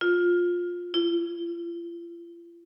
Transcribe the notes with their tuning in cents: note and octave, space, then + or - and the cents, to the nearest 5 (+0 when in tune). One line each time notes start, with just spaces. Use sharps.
F4 +15
F4 -40